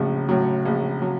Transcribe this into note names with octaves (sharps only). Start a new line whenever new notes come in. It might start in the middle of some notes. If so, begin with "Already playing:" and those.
Already playing: A#1 A2 C#3 F#3
A2 F#3
A#1
F#3